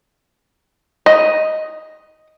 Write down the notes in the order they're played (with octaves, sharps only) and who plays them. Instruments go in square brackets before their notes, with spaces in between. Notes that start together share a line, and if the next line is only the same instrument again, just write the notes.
[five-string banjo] D#5